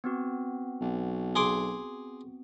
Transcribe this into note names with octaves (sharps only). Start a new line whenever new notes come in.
B3 C4 F#4
B1
G#4 C6 D6